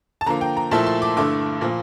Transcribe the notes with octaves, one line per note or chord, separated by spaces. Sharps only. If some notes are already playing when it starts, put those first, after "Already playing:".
A5
D3 F3 A#3 A#5
G5
A#5
A#2 F3 A3 E4 A5
C6
D6
G2 D3 A3 E4 D6
A#2 F3 A#3